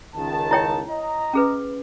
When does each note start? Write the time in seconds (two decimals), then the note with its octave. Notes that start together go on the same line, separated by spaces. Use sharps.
0.16 C#2 D#3 A5
0.51 E4 C#5 G5
0.90 D#5 A#5
1.33 C#4 G#4 B4